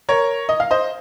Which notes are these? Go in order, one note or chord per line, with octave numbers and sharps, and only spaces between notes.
A#4 C#5
D#5
F5
C5 D#5